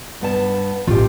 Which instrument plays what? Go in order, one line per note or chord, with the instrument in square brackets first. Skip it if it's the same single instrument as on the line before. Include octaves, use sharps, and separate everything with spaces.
[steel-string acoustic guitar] G2 B3 A5
[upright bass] A1 [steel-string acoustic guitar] F4 G4